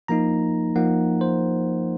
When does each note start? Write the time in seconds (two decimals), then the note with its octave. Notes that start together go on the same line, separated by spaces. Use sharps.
0.08 F3 A#3 D#4 A#5
0.76 F3 A#3 D#4 F#5
1.21 C5